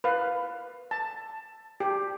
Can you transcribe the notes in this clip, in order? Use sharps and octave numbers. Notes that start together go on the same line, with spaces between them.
B4 F5
A5
G4